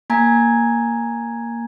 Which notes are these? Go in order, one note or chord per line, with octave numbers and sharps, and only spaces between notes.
A#3 G#5 A#5 G#6